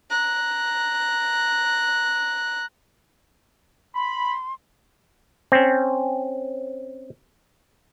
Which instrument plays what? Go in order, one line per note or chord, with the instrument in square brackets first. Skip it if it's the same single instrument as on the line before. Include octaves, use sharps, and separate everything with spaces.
[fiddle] A#5 F#6
[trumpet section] B5 [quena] C6
[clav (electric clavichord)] C4 C#4